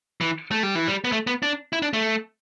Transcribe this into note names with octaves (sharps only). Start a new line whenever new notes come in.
E3
A3
G3
E3
G3
B3
A3
B3
D4
E4
D4
A3